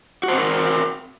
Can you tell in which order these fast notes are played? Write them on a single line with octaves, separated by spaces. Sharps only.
F#4 C5 C4 A#4